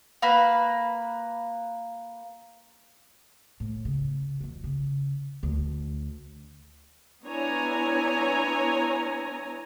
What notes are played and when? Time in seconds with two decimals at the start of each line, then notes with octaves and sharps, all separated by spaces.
0.22 A#3 B4 B5
3.60 A2
3.85 C#3
4.41 F2 D#3
4.64 C#3
5.43 D2 D4
7.25 B3 D4 E4 C#5 G#5 A#5